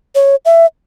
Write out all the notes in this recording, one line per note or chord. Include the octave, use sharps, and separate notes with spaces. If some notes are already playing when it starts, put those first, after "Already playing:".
C#5
E5